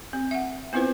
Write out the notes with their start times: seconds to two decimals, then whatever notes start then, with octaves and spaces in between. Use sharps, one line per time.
0.13 C4
0.31 E5 F#5
0.73 B3 C4 E4 F4 B4 C5